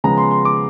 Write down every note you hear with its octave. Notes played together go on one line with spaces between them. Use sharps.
C#3 F3 G#3 B3 A#5
C6
C6
D6